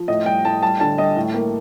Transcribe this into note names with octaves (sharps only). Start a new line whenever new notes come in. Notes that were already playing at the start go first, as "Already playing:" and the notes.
Already playing: F3
A2 D#5
G3 G5
A2 A5
G3 A5
D3 A5
G3 D#5
A2
A#3